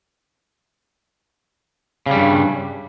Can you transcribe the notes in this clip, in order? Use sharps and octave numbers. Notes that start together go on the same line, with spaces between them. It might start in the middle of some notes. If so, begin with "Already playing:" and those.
G2 C#3 G3